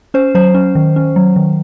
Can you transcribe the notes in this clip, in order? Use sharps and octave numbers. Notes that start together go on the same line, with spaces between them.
C#4 C5
F#3 C5
C#4
D#3
C#4
F#3
D#3